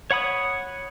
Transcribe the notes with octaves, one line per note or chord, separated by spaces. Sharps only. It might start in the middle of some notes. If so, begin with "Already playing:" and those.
C#5 F#5 B5 D#6